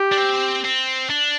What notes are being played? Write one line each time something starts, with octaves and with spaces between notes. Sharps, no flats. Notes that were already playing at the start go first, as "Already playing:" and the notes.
Already playing: G4
D4
C4
C4
D4